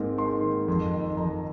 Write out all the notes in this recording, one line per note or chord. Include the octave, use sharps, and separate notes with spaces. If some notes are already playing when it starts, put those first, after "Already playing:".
Already playing: G#2 A#3 C4
G#2 C6
D#3
F2
D#3
F2 A#5